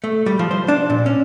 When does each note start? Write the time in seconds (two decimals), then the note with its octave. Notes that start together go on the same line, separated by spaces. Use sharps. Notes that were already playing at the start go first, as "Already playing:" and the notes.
0.04 A3
0.26 G3
0.39 F3
0.51 C5
0.68 D4
0.90 A#2
1.06 C#4